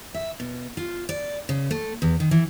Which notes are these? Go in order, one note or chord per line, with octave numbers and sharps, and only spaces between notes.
E5
B2
F4
D5
C#3
A3
E2
D#3
E3